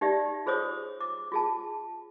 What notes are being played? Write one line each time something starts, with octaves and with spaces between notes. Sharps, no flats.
D#4 G4 D5 E5
F4 G#4 C5 C#5 D#6
D6
F4 G#4 A5